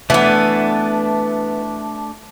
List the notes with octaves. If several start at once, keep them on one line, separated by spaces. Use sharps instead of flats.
E3 A3 B3 D4